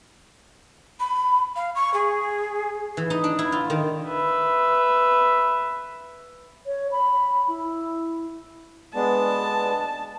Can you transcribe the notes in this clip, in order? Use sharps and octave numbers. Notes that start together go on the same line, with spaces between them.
B5
F5
C#6
G#4
E3
D#4
D4
E4
F4
D#3
B4 E5
C#5
B5
E4
G#3 B3 D4 A5